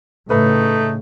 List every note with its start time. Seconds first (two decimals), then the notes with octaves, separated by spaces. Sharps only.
0.30 A2 C#3 A3 D#4 B4